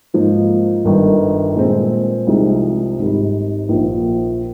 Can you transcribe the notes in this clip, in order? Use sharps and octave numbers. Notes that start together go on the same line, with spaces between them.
G#2 F3 A#3 F4
G1 G2 D#3
A#2 G#3 C4
C2 C3 F3 G#3 D#4
G#1 G#2 G3
A#1 A#2 F3